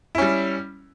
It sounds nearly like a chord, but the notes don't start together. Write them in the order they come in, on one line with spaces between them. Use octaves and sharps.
E4 C#4 G3